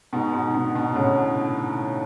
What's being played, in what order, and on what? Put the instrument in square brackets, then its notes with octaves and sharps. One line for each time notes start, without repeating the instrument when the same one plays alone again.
[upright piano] G#2 B2
G#2 B2
B2 D3
B2 D3
D3
A2 C#3